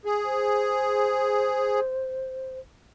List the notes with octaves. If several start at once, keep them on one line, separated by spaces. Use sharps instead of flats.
G#4
C5